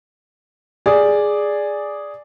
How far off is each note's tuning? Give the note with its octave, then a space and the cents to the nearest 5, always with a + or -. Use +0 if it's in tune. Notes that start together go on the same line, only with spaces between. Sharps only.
G#4 +0 D5 +0